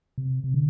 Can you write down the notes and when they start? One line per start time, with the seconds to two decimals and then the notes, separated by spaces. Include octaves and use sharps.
0.18 C3
0.44 C3
0.54 D3